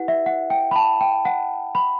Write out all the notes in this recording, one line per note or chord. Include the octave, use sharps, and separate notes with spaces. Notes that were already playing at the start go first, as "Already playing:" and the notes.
Already playing: E4 G4 B4 F#5
E5
F#5
G5
B5
A5
G5
F#5
B5